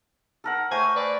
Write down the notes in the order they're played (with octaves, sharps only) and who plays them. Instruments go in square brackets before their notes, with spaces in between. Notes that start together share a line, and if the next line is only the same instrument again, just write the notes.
[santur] A4 A#4 F#5
[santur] A3 C#5 G5 [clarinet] C5 [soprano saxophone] G#5
[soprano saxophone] B4 [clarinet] D5